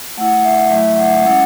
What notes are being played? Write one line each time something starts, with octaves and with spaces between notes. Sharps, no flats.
A3 E4 F#5
E5
F#3 A3 E4 E5
E5
F#5
G#3 C#4 E4 F#5